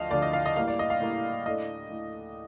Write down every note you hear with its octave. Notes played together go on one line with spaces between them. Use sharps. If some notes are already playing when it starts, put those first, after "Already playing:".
Already playing: D2 D3 F3 D#5 F5 A5
D2 D3 F3 D5
D#5
F5
D#5
A2 G3 A#3 F5
D5
D#5
F5
A2 G3 A#3
A2 A3 D4 D#5
A2